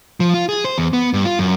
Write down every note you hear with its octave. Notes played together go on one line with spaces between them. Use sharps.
F3
F4
G#4
C5
E2
B3
G2
F4
F#2